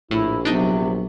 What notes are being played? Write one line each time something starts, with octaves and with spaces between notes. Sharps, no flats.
A#1 A2 E4
C3 F#3 B3 D4 D#4